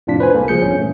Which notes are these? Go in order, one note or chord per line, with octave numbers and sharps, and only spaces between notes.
F2 A2 C3 D4 F4 B6
B4 C5 G#5 B5
C2 A#3 A4
C#2 F3 G#4 G6 C#7
G2 A#2 B3 C#4
E3 A3